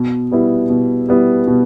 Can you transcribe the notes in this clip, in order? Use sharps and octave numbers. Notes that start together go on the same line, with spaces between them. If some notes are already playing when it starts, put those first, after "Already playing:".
Already playing: B2
G3 B3 E4
B2
G3 B3 E4
B2